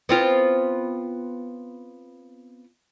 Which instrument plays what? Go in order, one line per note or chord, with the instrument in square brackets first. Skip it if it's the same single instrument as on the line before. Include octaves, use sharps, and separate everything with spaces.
[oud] B3 C4 F4